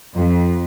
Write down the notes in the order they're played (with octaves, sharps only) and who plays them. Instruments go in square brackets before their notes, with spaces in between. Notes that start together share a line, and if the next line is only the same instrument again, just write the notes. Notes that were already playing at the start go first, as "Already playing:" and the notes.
[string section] F2